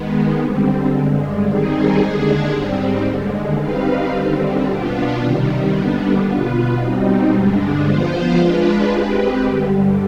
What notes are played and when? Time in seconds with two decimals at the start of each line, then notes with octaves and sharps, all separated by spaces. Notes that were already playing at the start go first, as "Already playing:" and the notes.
Already playing: D#3 G#3 B3
0.38 D3 G3 C4
0.91 G2 D3 G#3
1.45 D#3 G3 C4 D#4 G#4
1.98 D#2 D3 G#3 D4 G#4
2.51 G#2 G3 C4
3.04 D#2 D3 G#3
3.58 G3 C4 D#4 B4 F5
4.10 D#2 D3 G3 C4
4.64 B2 B3 D4 F4
5.17 C3 D#3 G3
5.70 D#2 D3 G3 B3 D4
6.24 B2 B3 F4 B4
6.77 B2 G3 C4 D#4
7.30 G2 D3 G#3 D4
7.83 F3 B3 F4 C5
8.37 G#3 D4 F4 B4
8.90 G#3 C4 G4 B4
9.43 G2 D3 G3